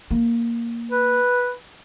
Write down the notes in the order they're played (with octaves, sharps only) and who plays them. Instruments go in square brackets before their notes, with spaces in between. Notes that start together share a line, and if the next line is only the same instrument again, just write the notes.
[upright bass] A#3
[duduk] B4